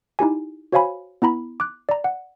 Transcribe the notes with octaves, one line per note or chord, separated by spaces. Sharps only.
D#4 E4 G4 G#5
F#4 C5 C#5 F5 G#5 B5
B3 E4 A#5 B5
D6 F#6
D5 A#5
F#5